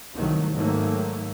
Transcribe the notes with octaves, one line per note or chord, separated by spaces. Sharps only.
C2 D#3 F#3 A3
G#2 D#3 F#3 A3 A#3